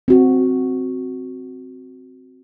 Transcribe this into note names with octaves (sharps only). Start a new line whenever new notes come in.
C4 F#4